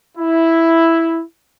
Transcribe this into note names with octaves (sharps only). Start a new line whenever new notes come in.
E4